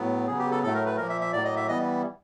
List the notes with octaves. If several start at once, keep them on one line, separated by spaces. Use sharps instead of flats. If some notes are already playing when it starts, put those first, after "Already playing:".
Already playing: A2 F#3 B3
C#3 F#3 B3 G#4
G4
A4
A2 F#3 A3 A4
A#4
B4
A#2 F3 A#3 A#4
E5
E5
A2 F#3 A#3 D5
D#5
E5
E3 G3 B3 D#5